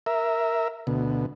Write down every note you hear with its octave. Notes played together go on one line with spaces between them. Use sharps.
A#4 E5
D2 B2